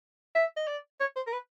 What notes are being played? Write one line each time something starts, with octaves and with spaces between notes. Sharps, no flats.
E5
D#5
D5
C#5
C5
A#4
B4